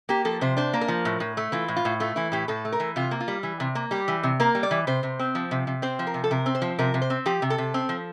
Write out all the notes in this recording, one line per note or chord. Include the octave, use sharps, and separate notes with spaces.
A#3 G4
F3 A4
C3 C5
D4 C5
A#3
A#4
F3
A2
A2
A3
E3 F4
A2
F4
A2
A3 F4
E3 E4
A2 G4
A2 A4
A3
A#4
E3
C3 F4
A#3
F4
G3
E3
C3
A#3
G3 G4
E3
C3
A#3 A#4
G3
D5
E3
C3 C5
C3
C4
F3
C3
C3
C4 C5
F3
A#4
C3
A4
C3 A#4
C4
C5
F3
C3 A#4
C3
C5
C4
F3 G4
C3
A4
C3
C4
F3